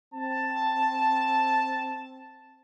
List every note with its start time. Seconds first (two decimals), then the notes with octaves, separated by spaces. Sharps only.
0.15 C4 A5